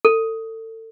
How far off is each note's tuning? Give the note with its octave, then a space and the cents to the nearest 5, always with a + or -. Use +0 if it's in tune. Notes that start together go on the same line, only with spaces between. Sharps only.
A4 +30